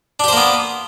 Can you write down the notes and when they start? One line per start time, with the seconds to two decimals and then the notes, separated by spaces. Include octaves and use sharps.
0.20 D4
0.24 G4
0.28 C5
0.33 A#3
0.37 B3